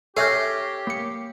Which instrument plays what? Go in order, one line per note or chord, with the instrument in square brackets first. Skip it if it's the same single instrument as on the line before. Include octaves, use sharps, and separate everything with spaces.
[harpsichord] C#4 [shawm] G4 [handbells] A4 E5 F6 [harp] G6 A#6 C7
[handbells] A#3 C#7